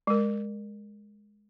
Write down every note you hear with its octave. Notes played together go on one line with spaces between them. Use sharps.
G#3 A#4